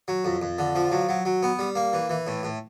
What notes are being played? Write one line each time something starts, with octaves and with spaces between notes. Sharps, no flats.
F#3
F2
F2
D3
F3
F#3
F#3
F#3
B3
G3
A#3
E3
E3
A2
A2